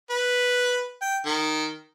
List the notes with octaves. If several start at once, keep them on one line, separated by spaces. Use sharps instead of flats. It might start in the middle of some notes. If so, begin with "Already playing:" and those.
B4
G5
D#3